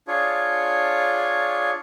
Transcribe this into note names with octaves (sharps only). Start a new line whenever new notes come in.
D4 F4 G#4 C#5